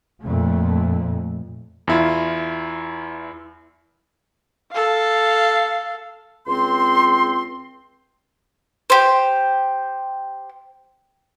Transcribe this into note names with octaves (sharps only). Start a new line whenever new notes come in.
F2 A#2 A3
E2 E4 F4
A4 F5
C#2 C4 C6
G4 C5